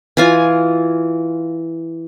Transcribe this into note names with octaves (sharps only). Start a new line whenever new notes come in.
E3 F4 G#5